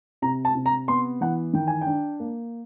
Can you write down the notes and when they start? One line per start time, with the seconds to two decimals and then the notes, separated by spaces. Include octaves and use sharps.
0.22 C3 A#5
0.45 A5
0.55 C3
0.66 A#5
0.88 B3 C6
1.21 E3 F#5
1.53 D#3 G5
1.67 G#5
1.81 G5
1.86 D4
2.20 A#3